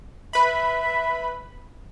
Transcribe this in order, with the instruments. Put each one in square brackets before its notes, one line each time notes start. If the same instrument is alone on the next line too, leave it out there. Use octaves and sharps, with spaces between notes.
[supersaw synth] B4 B5 [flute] E5